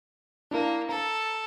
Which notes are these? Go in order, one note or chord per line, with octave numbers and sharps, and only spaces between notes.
A#3 D4 E4 A#4
A4 A#5